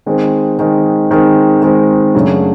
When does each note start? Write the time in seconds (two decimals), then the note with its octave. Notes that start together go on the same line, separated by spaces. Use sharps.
0.06 D#3 G#3 C4
0.59 D#3 G#3 C4
1.11 D#3 G#3 C4
1.62 D#3 G#3 C4
2.14 F#2 C#3 F#3 A3 D4